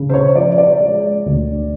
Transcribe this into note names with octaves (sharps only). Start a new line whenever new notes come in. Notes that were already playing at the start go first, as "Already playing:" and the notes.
Already playing: C#3
C5
C#5
F3 D5
D5
G#3
D2